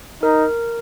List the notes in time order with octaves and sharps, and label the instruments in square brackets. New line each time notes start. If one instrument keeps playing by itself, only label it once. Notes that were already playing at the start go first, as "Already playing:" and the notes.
[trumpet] D#4 [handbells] A#4